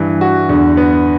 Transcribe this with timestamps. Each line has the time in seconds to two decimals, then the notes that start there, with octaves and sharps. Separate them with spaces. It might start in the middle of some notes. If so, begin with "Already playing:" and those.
Already playing: G2 E3
0.21 F#4
0.49 E2 D3
0.77 B3